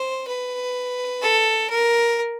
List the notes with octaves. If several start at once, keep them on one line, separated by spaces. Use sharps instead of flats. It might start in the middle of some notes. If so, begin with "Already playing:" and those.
Already playing: C5
B4
A4
A#4